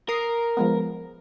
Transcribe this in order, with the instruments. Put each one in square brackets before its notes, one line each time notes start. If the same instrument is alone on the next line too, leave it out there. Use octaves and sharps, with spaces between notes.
[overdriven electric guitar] A#4 [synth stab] D#6 C7
[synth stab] F3 G#3 B3